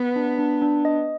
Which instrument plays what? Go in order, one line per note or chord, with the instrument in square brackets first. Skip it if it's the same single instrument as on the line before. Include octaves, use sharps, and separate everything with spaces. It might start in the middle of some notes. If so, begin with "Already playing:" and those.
Already playing: [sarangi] B3
[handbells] D4
D4
D4
D#5